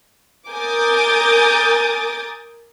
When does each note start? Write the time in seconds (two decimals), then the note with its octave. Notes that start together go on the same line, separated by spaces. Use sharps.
0.50 A#4 G#5 D6 D#6 G6 A6